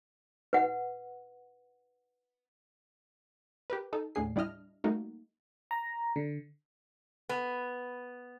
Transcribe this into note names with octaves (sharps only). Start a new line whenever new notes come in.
B4 F#5
G4 A#4 B4
D#4 A4
D#2 A2 D4 G#4 C7
G3 D4 E4 D#5 F6
G3 A3 A#3 D#4 F#4
A#5
D3
B3